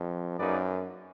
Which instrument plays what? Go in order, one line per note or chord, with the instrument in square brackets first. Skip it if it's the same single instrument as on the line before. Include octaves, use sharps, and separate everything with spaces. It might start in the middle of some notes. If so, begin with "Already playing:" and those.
Already playing: [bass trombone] F2
[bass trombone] F#2 [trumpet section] A#3 D#4 G#4 B4 D5